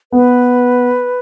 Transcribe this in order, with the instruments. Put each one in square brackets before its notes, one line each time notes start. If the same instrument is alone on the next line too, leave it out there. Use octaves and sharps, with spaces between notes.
[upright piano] B3 [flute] B4